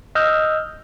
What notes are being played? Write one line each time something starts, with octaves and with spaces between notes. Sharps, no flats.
D#5 E6 F6 G6